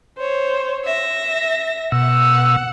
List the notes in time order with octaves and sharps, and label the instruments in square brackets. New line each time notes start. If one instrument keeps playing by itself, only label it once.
[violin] C5 C#5
E5 A#6
[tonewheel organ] B2 E6 [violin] F#5